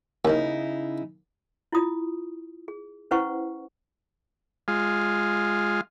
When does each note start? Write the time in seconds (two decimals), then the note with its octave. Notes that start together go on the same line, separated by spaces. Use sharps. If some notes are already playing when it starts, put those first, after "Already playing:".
0.25 D#2 C#3 D#4 E4
1.72 E4 F4 D#6
2.68 G#4
3.11 C#4 E4 B4 C5 F#5 C#6
4.68 G#3 F4